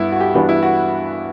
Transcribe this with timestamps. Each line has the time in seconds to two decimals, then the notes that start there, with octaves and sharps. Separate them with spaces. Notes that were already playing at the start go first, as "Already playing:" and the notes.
Already playing: G2 B3 D4 E4
0.12 F#4
0.20 G4
0.34 G2 E3 G3 B3 D4 F#4
0.49 E4
0.63 F#4